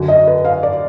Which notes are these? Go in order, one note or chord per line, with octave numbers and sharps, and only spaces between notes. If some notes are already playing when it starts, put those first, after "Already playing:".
Already playing: F#2 D3
D#5
B4
F5
D5